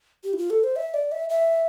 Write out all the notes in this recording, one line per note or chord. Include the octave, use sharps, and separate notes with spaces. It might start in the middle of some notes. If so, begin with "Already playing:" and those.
G4
E4
F4
A4
C5
E5
D5
E5
E5